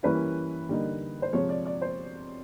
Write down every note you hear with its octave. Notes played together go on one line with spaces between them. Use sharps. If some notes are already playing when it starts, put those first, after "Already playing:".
E3 G3 A#3 C#4 E4 B4
D3 G3 A#3 D#4
C5
C3 F3 G#3 C#5
D5
D5
C5